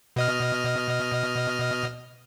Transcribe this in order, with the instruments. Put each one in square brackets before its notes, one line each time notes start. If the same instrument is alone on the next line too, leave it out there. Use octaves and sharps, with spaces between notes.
[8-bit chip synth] B2 D#5 F6